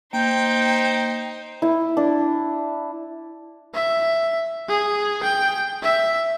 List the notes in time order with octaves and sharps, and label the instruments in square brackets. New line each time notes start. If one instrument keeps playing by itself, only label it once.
[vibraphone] A#3 [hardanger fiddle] D#4 C5 [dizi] G5
[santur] E4
D4
[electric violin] E5
G#4
G5
E5